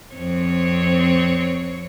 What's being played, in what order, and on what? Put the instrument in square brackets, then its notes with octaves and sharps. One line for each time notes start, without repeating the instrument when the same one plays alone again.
[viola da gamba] F2 C4 C#5